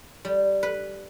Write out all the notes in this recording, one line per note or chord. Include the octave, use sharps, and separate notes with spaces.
G3
B4